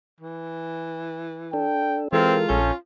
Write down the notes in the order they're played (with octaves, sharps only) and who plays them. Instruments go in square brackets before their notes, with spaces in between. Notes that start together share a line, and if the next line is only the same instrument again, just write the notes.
[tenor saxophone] E3
[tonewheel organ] D4 A4 [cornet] G5
[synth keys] E3 A4 A#4 [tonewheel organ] G#3 [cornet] C4 [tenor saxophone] F4
[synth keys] A#1 A4 G6 [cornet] C#4